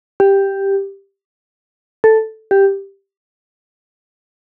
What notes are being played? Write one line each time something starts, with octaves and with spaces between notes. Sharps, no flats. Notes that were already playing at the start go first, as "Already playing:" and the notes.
G4
A4
G4